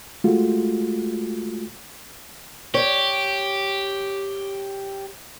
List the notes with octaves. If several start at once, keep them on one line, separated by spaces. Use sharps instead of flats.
G#3 A3 F4 F#4
G4 C#5